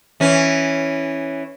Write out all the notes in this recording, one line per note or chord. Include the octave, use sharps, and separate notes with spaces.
E3 C#4